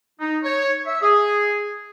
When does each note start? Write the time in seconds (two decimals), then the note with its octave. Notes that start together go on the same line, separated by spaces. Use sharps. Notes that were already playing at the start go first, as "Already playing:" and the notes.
0.20 D#4
0.44 C#5
0.86 E5
1.02 G#4